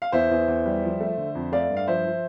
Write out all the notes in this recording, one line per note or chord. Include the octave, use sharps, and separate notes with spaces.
F5
E2 C5 E5
E2
E2
G3
F3
A3
D3
F2
A3 D5 F5
G2
F5
F3 C5 E5
F3